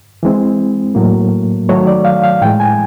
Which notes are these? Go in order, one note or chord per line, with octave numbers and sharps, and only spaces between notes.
E3 G#3 C4
A2 F#3 A#3
D#3 F#3 A3 C#5
D5
F5
F5
A2 E3 G#3 G5
G#5